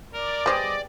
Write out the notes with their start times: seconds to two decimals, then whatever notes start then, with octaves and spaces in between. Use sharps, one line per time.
0.14 A#4 D5
0.46 G3 B3 G4 G#4 C5 D#5